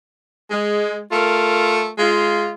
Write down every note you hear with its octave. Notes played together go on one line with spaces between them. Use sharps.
G#3
A3 F4 A#4
G#3 F4